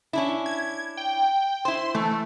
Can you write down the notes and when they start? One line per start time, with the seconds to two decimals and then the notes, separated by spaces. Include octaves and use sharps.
0.13 C#4 D4 E4
0.46 G#6
0.97 G5
1.65 E4 C5 C6
1.95 E3 A3